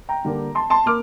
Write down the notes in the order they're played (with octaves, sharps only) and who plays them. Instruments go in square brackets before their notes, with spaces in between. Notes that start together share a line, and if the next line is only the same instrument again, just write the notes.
[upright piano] G5 A#5
D3 G3 A#3 D4
A5 C6
A5 C6
A#3 D6 F6